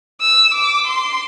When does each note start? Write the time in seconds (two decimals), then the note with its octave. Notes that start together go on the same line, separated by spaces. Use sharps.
0.21 E6
0.54 D6
0.87 C6